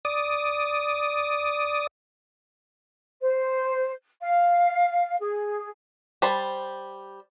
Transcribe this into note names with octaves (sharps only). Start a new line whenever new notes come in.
D5 D#6
C5
F5
G#4
G3 C5 A5 B5